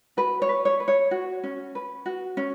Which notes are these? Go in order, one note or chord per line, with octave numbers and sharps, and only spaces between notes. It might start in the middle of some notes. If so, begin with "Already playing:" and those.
F#4 B4
C#5
B4
C#5
B4
C#5
F#4
C#4
B4
F#4
C#4